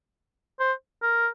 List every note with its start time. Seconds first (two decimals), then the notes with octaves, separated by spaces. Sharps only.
0.59 C5
1.02 A#4